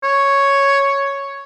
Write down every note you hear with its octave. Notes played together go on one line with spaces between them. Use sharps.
C#5